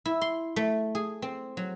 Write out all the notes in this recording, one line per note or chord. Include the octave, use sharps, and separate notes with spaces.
E4
C6
A3
G#4
C4
F#3